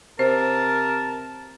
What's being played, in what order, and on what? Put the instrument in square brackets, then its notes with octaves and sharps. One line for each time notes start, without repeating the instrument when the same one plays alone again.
[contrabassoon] C3 [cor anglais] A#4 [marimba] C5 [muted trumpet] A5